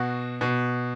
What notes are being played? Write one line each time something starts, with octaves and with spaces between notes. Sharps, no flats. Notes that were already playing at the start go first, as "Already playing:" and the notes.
Already playing: B2 F#4
B2